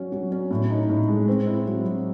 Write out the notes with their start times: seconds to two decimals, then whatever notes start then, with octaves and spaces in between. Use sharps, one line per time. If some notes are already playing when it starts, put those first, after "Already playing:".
Already playing: F#3 C#4
0.12 F#3
0.32 C#4
0.51 A2
0.70 D#4
0.89 A2
1.08 G#3
1.28 C4
1.47 E4
1.66 F#3
1.85 F#3